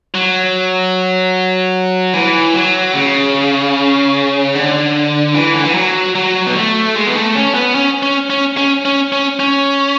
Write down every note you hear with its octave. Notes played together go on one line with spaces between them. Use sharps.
F#3
E3
F#3
C#3
D3
E3
D3
E3
F#3
F#3
B3
A3
G#3
B3
A3
C#4
B3
C#4
C#4
C#4
C#4
C#4
C#4
C#4